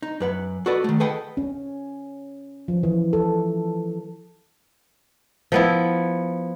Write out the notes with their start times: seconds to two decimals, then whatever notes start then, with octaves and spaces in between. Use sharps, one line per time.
0.03 D#4
0.20 F#2 B4 F#5
0.66 F#4 A4 B4 D5 D#5
0.84 D#3 A3
1.00 G#4 A4 B4 D#5 F#5 G5
1.37 C#4
2.68 F3
2.83 E3
3.13 A4
5.52 F3 B3 E4